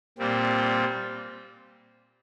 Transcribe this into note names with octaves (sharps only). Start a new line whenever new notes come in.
A#2 G3 C4